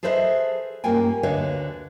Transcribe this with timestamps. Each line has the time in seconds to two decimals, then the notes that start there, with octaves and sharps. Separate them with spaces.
0.03 G#4 A4 B4 C5 D#5 E5
0.84 G2 A#3 C#4 F4 G5 G#5
1.23 D2 D3 B4 C#5 D#5 F5